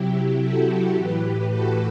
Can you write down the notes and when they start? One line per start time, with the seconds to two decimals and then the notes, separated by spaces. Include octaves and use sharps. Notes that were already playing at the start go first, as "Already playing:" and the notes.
Already playing: C3 F#3 E4 G4
0.38 F#4 A4
0.93 A2 E3 G4 B4
1.48 F#4 A4